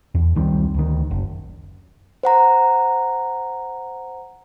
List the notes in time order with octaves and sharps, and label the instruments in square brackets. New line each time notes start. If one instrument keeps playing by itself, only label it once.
[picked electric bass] E2
C#2 D#3 G3 C4
D2 D#3
F#1
[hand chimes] C5 F#5 A#5